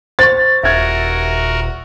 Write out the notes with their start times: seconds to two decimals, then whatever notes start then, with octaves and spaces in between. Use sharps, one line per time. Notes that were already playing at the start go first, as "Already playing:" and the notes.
0.19 C5 C#6 A6
0.63 D#1 F#4 A#4 E5 G#6